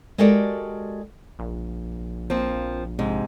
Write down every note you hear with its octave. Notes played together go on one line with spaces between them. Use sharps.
G#3 F#4 G4 A4 A#4 D5
A#1
F3 A#3 C4
G#2 C3 G#3